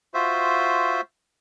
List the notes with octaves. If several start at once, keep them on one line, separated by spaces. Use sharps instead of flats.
F4 F#4 C5 E5